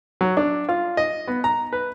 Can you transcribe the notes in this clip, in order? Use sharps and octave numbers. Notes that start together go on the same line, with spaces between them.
F#3
D4
F4
D#5
B3
A#5
B4